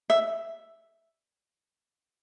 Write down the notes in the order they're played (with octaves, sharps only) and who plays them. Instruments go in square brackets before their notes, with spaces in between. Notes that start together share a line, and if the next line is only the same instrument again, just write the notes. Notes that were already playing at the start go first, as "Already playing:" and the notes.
[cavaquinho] E5